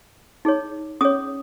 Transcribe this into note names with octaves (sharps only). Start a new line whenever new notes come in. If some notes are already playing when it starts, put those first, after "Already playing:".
D#4 G#4 C#5
C#4 G#4 C#5 D#6